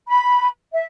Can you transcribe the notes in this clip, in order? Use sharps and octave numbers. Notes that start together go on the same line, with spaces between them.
B5
E5